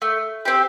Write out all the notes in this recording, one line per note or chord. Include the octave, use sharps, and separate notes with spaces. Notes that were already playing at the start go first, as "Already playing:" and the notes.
A3
C4 G4